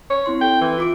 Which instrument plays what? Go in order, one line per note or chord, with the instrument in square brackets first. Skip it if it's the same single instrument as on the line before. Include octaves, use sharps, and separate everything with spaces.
[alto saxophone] C#5
[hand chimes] C4 E4 C6
[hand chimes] A4 [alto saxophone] G5
[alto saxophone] E3
[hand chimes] F4 D6 D7